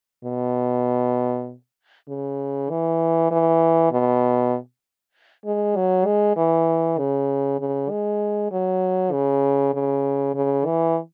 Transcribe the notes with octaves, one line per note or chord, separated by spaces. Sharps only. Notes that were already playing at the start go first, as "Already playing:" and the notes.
B2
C#3
E3
E3
B2
G#3
F#3
G#3
E3
C#3
C#3
G#3
F#3
C#3
C#3
C#3
E3